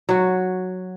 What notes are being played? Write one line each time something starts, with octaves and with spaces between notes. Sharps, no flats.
F#3 F#4